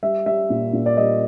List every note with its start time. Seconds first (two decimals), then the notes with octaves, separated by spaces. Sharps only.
0.03 G3 E5
0.26 G3 E5
0.50 A#2
0.73 A#2
0.86 D5
0.97 G3 D#5